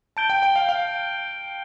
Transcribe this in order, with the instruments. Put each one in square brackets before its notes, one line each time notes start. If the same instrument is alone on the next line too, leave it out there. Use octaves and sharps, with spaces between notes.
[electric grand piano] A5 [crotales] G6 D7 G7
[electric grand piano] G5
G5
F5
F5